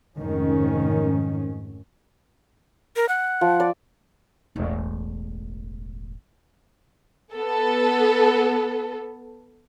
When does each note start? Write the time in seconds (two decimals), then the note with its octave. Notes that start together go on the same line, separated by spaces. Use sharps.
0.17 F1 G#2 D#3 C#4
2.96 A#4
3.09 F#5
3.41 F3
3.60 D5
4.56 E1 A1
7.33 B3 A4